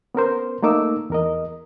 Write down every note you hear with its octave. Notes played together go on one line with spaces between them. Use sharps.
B3 C#4 A#4 C5
A3 A#3 D#4 D6 E6
E2 A#4 D#5